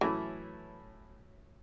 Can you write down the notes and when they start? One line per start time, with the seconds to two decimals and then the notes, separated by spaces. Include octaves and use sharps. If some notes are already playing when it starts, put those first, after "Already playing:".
0.01 A2 E3 F#3 A3 C#4 E4